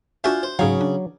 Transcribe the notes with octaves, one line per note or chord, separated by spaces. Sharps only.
D4 F4 F#4 C5 E5 G#5
C5
G#2 C#3 F#3 D#4 F5 G#5
D4